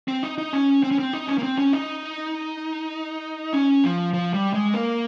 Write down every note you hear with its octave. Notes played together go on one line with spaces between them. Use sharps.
C4
D#4
D#4
C#4
C4
C#4
C4
D#4
C#4
A#3
C4
C#4
D#4
C#4
F3
F3
G3
G#3
A#3